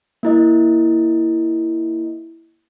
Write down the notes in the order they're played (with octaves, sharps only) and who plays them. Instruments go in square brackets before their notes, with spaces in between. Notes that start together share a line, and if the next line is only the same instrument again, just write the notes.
[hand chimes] A#3 E4 D#5